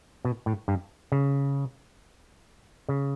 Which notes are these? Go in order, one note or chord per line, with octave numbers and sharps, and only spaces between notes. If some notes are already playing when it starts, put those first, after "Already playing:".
B2
A2
G2
C#3
C#3